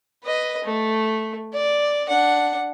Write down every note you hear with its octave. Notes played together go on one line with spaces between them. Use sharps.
B4 D#5
A3
D5
D4 F#5